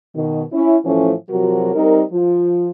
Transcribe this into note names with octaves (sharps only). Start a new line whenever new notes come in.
B2 D#3
C#4 E4
A2 E3 F3 A3 C#4
C3 F3 F#3 F#4 A#4
G3 C4 D#4 A#4
F3